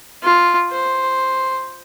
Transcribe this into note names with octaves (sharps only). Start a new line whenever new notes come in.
F4
C5